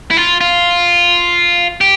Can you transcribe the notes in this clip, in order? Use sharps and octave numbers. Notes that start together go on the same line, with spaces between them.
E4
F4
F4
G4